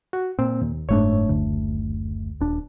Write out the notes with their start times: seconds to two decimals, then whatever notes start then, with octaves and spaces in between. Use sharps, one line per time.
0.13 F#4
0.39 A#2 C4
0.62 D#2
0.89 F#1 G#2 A3 D4 C#5
1.29 D2
2.41 D#1 D4